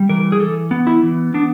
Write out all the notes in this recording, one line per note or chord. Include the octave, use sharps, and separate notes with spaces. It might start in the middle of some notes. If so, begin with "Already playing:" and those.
Already playing: G3
E3 A#4
G#4
E3 A4
B3
E4
E3
B3 D4